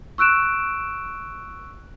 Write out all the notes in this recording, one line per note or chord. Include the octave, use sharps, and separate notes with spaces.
C#6 E6 F#6 D7 E7